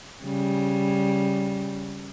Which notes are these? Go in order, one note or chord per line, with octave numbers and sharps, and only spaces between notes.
C#3 G3